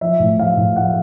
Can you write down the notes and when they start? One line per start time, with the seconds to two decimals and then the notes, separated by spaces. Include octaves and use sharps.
0.01 F3 E5
0.20 A2
0.39 F3 F5
0.57 A2
0.76 F3 F#5